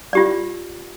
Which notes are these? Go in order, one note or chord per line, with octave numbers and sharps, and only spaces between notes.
F4 G4 D5